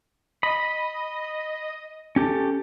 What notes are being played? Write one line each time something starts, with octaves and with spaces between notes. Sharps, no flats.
D#5 B5
C#4 G4 A4